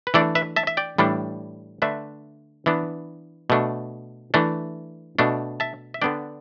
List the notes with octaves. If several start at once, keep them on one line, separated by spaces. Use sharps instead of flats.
B4
E3 A3 D4 A4 D5
B4 E5
E5 A5
E5
D5 G5
A2 E3 G3 D4
D3 A3 D4 B4 E5
E3 B3 D4
B2 A3 D4
E3 A3 D4
B2 A3 D4
E5 A5
E5
D3 B3 D4 D5 G5